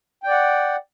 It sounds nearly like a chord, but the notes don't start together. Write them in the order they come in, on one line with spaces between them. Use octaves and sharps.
G5 D5 F#5